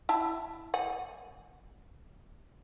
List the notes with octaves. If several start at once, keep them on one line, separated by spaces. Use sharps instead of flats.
E4 E5 A5
F#5 G#5